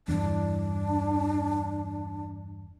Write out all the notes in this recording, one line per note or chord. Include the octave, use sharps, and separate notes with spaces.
E2 G2 E3 D4